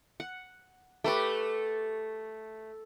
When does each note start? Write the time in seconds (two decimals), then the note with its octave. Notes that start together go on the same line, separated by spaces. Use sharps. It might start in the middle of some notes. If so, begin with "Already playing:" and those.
0.20 F#5
1.04 A3 G4 B4 G5